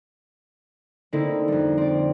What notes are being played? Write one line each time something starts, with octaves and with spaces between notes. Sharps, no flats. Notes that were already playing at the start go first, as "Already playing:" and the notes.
D3 A3 A#3 C4 D#4 E4
F2 G3
C4 D5